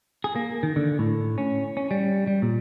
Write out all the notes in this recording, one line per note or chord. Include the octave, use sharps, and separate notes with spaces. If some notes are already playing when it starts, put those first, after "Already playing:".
G#4
A#3
D#3
D3
A2
C#4
C#4
G3
G3
A#2